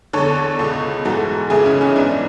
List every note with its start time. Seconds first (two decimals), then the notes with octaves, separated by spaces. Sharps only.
0.13 E2 D3 A4 C#5
0.59 C#2 B2
1.05 G#2 E3 F#4 A4
1.50 C#2 C#3 E3 E4 G#4
1.66 C#4
1.81 C#4 E4
1.96 G#2 E3 B3 D4